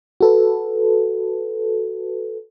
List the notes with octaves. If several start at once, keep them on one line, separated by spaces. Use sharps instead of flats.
F#4 A4 B4